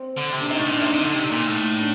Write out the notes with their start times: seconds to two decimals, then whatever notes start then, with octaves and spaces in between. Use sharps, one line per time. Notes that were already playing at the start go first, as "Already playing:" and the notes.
Already playing: C4
0.17 D3
0.33 C3
0.40 D4
0.50 C3 D#4
0.58 A2
0.61 D4
0.66 A#2
0.76 D4
0.82 C3 D#4
0.93 C3
1.04 D3
1.14 C3
1.30 A#2
1.46 A2
1.79 D4